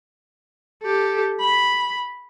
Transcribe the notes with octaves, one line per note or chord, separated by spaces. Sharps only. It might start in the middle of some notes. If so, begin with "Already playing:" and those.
G4 A4
B5